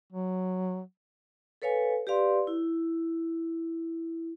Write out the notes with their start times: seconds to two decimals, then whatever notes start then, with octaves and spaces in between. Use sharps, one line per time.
0.12 F#3
1.62 A4 B4 C#5 F5 G#5
2.07 G4 B4 D5 F5 C6
2.47 E4